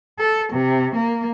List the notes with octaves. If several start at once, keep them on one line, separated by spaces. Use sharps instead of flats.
A4
C3
A#3